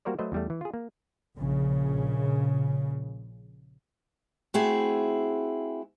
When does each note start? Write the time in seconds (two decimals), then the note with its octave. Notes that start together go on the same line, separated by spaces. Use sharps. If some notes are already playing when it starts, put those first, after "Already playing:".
0.05 G3 A#3 F#4 A#4 C5 D5
0.19 F#3 A3 B4 C5 D#5 E5
0.32 E2 G3 A3
0.50 E3
0.61 F4 G#4
0.74 A#3
1.38 A#1 C#3
4.54 A3 C4 E4 F#4 G#4